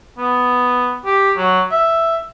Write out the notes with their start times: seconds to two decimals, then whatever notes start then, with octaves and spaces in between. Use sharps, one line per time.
0.18 B3
1.06 G4
1.37 F#3
1.72 E5